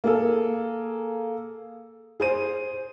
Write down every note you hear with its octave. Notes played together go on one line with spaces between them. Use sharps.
A#3 G#4 A4
G#4 C5 D#7